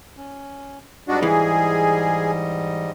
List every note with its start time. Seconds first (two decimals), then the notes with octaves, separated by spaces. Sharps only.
0.17 C#4
1.08 G#2 G3 D4 F#4 D#5
1.23 E3 G#4